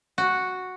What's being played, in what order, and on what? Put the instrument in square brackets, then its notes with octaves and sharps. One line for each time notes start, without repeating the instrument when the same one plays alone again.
[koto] F#4